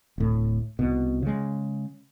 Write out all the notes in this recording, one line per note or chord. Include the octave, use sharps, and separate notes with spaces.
D1 A2
C2 B2
C#3 G#3